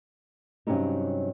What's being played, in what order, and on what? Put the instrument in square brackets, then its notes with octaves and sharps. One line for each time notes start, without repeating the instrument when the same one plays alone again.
[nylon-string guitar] G2 C3 F#3 C#4 D#4 G4